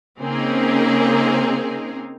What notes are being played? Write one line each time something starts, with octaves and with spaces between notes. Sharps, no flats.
C#3 A#3 C4 D#4 G#4 A#4